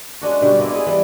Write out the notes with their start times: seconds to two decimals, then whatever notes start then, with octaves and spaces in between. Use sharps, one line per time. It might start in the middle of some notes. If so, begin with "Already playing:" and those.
0.21 G#3 C#4 D4 F#4
0.41 B2 D3 G3 G4
0.59 G#3 A#3 E4 D5
0.72 B3 E4 G#4
0.86 E3 G3 A4